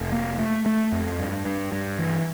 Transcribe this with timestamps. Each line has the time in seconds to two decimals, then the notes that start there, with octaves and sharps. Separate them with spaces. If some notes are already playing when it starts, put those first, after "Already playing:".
Already playing: F1
0.12 A#3
0.39 A3
0.66 A3
0.92 F2
1.19 G2
1.46 G2
1.72 G2
1.99 E3